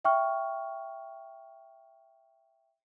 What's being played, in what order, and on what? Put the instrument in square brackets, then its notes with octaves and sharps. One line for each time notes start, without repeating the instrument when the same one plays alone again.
[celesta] E5 G5 C#6 F6